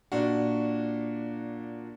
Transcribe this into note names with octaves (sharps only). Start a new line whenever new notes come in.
A#2 D4 F#4